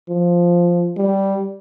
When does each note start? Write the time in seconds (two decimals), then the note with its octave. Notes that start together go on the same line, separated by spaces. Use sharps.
0.09 F3
0.96 G3